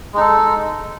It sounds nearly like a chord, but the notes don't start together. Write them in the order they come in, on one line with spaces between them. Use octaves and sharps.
G#3 D#4 A4